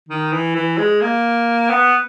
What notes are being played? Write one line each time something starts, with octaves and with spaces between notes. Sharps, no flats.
D#3
E3
E3
G#3
A#3
B3